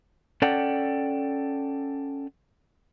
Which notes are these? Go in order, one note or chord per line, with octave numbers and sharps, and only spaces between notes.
C#4 A4 D5 F#5 G5